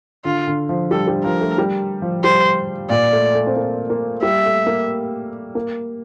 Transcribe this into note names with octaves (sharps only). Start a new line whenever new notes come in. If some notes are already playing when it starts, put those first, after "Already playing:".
D3 F4
D3
F3
G3 A4
G3
F3 A#4
A3
G3
F3
G3 C5
A#2 D5
A3
A3
C4
A#3
A#3
G3 E5
A3
A#3
A#3